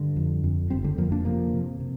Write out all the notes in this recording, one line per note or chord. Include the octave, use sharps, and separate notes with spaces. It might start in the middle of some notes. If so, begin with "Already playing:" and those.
Already playing: G2 D3
F2
F2
G1 G3 C4
D3 G3
F2 F3 A#3
A#3 D4
C3 F3 A#3
C3
C3